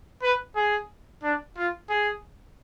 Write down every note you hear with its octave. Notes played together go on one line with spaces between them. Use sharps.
B4
G#4
D4
F4
G#4